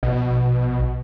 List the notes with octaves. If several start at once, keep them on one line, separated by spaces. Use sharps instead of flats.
A#1 B2